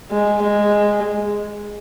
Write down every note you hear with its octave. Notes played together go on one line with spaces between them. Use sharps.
G#3
G#3